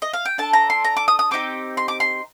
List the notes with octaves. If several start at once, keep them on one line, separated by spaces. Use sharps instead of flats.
D#5
F5
G5
D4 A4 A5
A#5
C6
A#5
D6
D#6
D#6
C4 D#4 G4 D6
C6
D6
C6